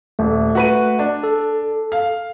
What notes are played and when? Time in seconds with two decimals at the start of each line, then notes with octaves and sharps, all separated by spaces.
0.19 D#1 A3
0.55 F#4 B4 D#7
0.99 D4
1.24 A4
1.92 F5